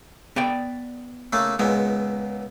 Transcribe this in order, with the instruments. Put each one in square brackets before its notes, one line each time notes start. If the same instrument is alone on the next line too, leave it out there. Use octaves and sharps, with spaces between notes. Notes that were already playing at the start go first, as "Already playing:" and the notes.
[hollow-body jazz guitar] B3 D5 G5
[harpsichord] C#3 A3 A#3
[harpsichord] C#2 A#2 B3 [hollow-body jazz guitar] G#3